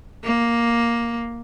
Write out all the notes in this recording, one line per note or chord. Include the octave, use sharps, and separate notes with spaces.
A#3